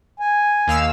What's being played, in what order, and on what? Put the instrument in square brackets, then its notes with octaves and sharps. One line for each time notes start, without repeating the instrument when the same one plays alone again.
[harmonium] G#5
[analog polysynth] D#2 F5 E6